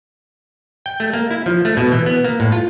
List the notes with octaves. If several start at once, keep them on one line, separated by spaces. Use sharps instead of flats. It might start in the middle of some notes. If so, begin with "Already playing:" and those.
G5
A3
A#3
E4
F3
A3
B2
E3
B3
A#3
A2
F4